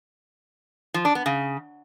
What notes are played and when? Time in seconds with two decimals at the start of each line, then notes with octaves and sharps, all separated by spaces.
0.94 F3
1.05 D4
1.15 B3
1.26 C#3